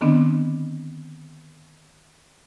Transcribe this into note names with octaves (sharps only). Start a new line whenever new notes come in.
D3 D#3 B3 C4 D4